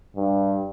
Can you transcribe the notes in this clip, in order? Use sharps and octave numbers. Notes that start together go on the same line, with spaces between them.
G2